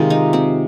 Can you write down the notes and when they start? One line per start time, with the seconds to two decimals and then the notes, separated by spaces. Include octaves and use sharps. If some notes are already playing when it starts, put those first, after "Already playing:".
Already playing: C3 D#3 G#3 F4
0.10 D#4
0.33 C4